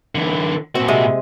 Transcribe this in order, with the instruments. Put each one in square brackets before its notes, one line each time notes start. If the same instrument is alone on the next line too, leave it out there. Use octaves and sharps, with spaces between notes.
[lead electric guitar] D3 E3
[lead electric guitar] A#2 F#4 [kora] C4
[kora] C3 G#3 D#5